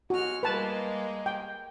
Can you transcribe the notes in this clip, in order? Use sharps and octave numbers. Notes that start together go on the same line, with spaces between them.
G#3 F#4 F6
G3 G#3 A#3 B4 A5
G5